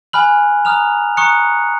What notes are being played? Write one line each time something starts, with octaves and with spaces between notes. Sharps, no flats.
G#5 B5 F6 F#6 F#7
A#5 D#6 F6 F#6 F7
A#5 C#6 D#6 F#6 C#7